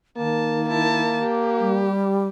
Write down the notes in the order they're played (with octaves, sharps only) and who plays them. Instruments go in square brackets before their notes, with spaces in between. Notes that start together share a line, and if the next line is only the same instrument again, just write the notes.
[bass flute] D#3 [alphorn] A#3 [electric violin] A5
[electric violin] E4 A5
G4
[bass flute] G3